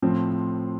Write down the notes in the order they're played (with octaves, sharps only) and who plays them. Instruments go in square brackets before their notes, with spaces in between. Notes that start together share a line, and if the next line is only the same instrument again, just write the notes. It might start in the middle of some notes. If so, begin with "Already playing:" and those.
[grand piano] A2 F3 C4